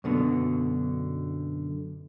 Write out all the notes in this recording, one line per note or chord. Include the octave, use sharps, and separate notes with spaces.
F#2 B2 D3